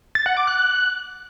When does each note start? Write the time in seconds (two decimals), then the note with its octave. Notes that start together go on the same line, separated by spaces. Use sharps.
0.15 A6
0.26 F#5
0.37 D6
0.47 F#6